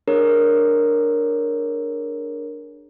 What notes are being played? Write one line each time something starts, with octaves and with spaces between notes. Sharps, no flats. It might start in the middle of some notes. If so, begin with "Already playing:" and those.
D4 G#4 A#4 C#5